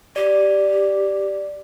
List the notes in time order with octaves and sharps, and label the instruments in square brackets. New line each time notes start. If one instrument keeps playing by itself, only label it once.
[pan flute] G4 [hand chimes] D5